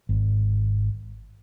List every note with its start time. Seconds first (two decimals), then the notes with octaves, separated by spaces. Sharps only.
0.09 G#1